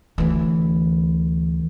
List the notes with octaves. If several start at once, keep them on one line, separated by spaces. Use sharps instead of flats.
D2 E3